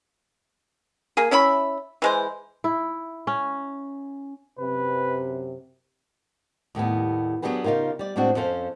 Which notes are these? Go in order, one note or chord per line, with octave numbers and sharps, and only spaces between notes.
A#3 G#4
C#4 E4 E5 B5
E3 G#3 C5
E4
C#4
F#2 C3 B4
D#2 A2 G3 B3
F#3 B3 D4 G4 G#4 B4
C#3 D#4 F4 G4 A#4
G3 D5
A2 G#3 C4 D4 F#4
F2 C#4 A4 C5 F5